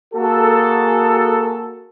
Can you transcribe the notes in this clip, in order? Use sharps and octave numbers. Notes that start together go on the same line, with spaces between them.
A#3 F#4 G#4 A4